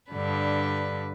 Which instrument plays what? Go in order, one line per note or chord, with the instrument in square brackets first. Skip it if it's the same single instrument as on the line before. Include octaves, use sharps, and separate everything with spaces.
[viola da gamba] G2 D3 B4